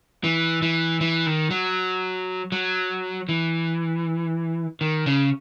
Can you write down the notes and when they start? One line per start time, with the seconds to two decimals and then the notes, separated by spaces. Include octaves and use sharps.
0.24 E3
0.62 E3
1.01 E3
1.26 D#3
1.51 F#3
2.52 F#3
3.29 E3
4.81 D#3
5.06 C#3